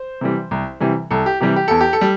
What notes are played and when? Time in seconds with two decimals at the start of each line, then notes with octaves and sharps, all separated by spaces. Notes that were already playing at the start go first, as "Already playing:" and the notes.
Already playing: C5
0.21 C3 E3 G3
0.51 C2
0.80 C3 E3 G3
1.11 C2 A4
1.26 G4
1.41 C3 E3 G3 G4
1.56 G4
1.68 E2 A4
1.81 G4
1.93 A4
2.01 G3